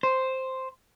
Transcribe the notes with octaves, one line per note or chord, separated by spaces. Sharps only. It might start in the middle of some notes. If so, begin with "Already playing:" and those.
C5